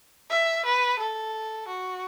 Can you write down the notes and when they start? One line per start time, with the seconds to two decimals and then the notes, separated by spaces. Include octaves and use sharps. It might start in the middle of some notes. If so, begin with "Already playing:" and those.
0.30 E5
0.65 B4
0.99 A4
1.68 F#4